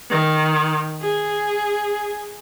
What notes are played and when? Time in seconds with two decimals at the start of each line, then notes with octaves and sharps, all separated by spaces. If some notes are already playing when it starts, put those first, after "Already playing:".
0.11 D#3
1.02 G#4